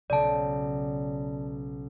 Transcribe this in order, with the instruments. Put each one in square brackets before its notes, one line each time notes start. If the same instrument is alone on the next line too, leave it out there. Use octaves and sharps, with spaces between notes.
[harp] B1 C#3 [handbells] D5 A5